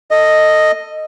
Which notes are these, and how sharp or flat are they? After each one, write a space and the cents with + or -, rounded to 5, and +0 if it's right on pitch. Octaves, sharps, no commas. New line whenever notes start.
A4 +20 D#5 +0